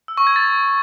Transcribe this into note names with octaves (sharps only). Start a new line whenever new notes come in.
E6
C#6
G#6
A6